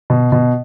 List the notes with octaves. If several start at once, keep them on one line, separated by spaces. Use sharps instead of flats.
B2
B2